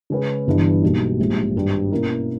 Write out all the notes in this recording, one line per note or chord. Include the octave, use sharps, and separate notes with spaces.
C#3 G#3 C#4 G#4 B4
G1 G2 E3
B1 B2 G3 A#3 D#4
A#1 G#2 G3
G#1 G2 G3
B2 A#3 C#4 E4 A#4